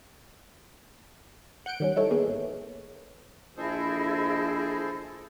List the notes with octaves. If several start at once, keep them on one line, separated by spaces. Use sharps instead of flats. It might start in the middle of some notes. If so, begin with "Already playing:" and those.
F#5 G6 C#7 D7
D#3 G3 C#4
D#4 E4 A4 C#5
A#3 B3 G#4
A1
A#1 E4 G#4 A4 C5 D#5